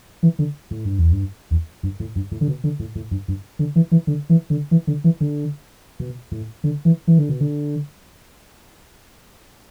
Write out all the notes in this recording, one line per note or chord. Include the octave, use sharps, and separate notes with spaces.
E3
D3
A2
G2
E2
G2
E2
G2
A2
G2
A2
D3
B2
D3
A2
A2
G2
G2
D3
E3
E3
D3
E3
D3
E3
D3
E3
D3
B2
A2
D3
E3
E3
D3
B2
D3